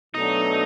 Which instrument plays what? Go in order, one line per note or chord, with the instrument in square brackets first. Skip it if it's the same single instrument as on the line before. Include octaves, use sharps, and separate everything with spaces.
[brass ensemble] B2 F#3 A3 D4 [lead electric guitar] D#4